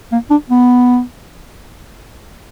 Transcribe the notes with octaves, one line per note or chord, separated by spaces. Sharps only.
A#3
D4
B3